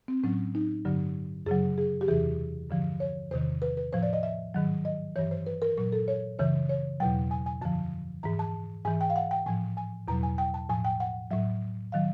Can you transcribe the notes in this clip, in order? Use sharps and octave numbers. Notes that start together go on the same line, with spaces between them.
C4
A2 F#3 C#4
D#4
G2 D3 F#3
F#2 C#3 F#3 G#4
G#4
G4
E2 C3 E3 G#4
G2 D3 F3
C#5
E2 C3 D#3 C5
B4
B4
A2 F3 C5
D5
D#5
E5
G#2 D#3 F#3
D#5
G2 E3 C#5
C5
B4
A#4
A#2 F#3 A#4
A4
C#5
F#2 C#3 E3 C#5
C#5
E2 B2 F#3 G5
G#5
G#5
F#2 D3 F3 A5
G#2 E3 A#5
A5
G#2 E3 G#5
G5
F5
F#5
G5
A2 F3 G#5
G#5
E2 B2 F#3 A#5
G#5
G5
A5
A2 F3 G#5
G5
F#5
A2 F#3 E5
D#3 F#3 F5